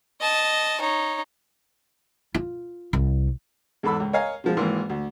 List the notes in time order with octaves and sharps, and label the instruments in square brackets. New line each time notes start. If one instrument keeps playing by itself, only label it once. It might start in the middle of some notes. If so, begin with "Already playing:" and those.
[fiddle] D#5 A5
D#4 C#5
[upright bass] F4
C2
[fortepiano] E2 G#2 A4 B5 E6
C#2
C#5 D#5 F5 G#5 A#5
B2 F3 G#3
G#1 G#2 E3 A#3 C6
D2